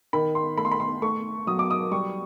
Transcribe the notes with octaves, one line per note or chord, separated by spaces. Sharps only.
D#3 B5
C6
A3 B5
C6
B5
C6
A3 C#6
F#3 D#6
D6
D#6
G3 C#6